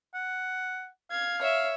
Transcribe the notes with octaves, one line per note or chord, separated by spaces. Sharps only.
F#5
F5 G#6
C#5 E5